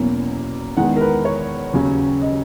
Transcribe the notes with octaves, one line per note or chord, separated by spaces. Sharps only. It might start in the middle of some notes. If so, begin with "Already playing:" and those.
Already playing: E2 B2 F#3 A#3 C#4
E2 D#3 G#3 B3 F#5
A#4
B4
C#5
D#2 C#3 F#3 C#4
D#5